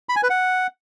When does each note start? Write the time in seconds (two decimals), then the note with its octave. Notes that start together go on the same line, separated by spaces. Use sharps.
0.09 B5
0.16 G#5
0.23 B4
0.30 F#5